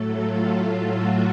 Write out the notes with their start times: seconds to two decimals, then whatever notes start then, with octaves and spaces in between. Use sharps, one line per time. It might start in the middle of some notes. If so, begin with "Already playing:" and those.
Already playing: A2 F#3 A3 A4
0.17 F4
0.53 F4
0.88 F#4